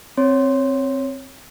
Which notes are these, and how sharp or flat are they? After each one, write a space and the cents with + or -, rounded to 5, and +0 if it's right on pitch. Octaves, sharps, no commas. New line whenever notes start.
C4 +10 C#5 +0 C6 +0